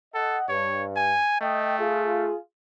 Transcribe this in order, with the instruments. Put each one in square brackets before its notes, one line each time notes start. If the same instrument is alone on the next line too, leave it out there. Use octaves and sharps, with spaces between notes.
[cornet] A4 [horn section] D#5 F#5
[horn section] G2 [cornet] C#5
[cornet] G#5
[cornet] A3 [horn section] D#5 G5
[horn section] F4 G#4